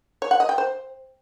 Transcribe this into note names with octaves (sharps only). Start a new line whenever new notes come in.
C#5
F#5
D#5
G5
C5